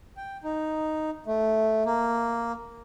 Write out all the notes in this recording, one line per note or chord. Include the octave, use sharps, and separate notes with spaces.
G5
D#4
A3
A#3